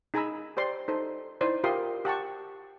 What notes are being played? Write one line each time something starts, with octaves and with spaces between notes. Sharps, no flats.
D#4 G#4 G#5 A#5 B5 E6
G4 C5 D5 C6
D#4 A4 C5
D#4 E4 C5 D5
F4 G4 A#4 E5 C6 D#6
G4 F#5 A5 C#6